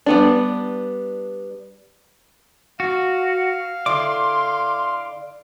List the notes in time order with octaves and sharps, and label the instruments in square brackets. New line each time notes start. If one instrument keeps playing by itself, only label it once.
[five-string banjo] G3 B3 D4
[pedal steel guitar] F#4 [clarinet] F5
[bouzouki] D3 E4 D5 [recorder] C6 [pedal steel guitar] D6